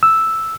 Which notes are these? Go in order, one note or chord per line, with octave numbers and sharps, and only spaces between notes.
E6